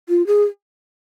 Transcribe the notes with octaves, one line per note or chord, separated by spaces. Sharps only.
F4
G#4